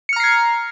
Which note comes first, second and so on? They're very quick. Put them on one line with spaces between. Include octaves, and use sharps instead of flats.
C#7 F6 A#5 C7 G#6